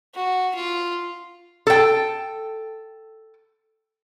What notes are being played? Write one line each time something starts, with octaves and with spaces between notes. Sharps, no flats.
F#4
F4
A4 G5